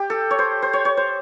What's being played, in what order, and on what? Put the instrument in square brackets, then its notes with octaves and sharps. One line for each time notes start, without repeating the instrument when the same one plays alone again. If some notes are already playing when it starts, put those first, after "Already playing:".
Already playing: [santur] G4
A4
C#5
C5
C5
C#5
C#5
C5